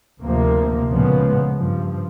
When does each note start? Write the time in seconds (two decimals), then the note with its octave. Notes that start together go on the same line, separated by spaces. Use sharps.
0.21 D2 C3 F3 A#3
0.91 C#2 A#2 C#3 F3 G#3 B3
1.58 G2 F3